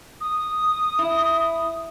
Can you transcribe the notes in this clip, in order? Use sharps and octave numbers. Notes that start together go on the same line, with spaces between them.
D#6
E4